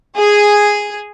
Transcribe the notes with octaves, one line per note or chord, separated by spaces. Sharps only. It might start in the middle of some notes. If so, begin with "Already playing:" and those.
G#4